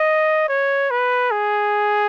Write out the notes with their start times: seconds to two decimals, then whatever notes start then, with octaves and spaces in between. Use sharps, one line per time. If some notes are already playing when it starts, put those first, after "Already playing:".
Already playing: D#5
0.49 C#5
0.91 B4
1.31 G#4